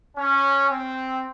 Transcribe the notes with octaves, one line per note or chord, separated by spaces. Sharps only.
C#4
C4